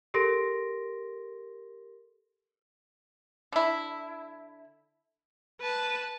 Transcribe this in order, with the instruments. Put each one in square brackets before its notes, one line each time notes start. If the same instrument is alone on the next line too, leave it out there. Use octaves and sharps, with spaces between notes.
[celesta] G4 A4 A#4 C6 A#6 D7
[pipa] D3 E4
[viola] B4 [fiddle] A5